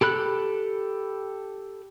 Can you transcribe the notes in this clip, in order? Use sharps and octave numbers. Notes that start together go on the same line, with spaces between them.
G4 A4 B5 F#6